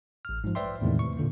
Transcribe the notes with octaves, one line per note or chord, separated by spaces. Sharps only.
A1 F6
G#2 F3
B4 C5 D5 E5 G5 C6
E2 A2 C3 D#3 G#3
C#6
A#2 D3 A#3